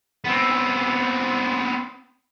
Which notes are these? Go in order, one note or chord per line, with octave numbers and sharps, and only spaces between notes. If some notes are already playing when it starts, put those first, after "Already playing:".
B3 C4